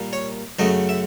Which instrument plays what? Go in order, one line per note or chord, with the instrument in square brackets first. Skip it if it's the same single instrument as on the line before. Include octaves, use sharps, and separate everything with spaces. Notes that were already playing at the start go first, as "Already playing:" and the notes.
Already playing: [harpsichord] A#2 G3 A#3
C#5
F#2 C#3 F#3 A3 D#5
E5